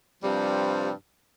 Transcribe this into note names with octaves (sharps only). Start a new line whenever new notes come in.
G2 C3 F3 G3